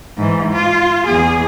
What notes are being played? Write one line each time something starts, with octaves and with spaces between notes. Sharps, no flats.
G#2 E3
F4
E2 G#4